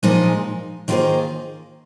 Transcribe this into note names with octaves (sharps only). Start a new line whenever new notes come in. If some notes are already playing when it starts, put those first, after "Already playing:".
A#2 F3 G#3 D#4 G#4
D#3 A#3 F4 G#4 C5